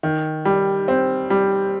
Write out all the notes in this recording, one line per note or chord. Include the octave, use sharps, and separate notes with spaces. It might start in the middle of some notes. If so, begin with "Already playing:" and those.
D#3
G3
C4
G3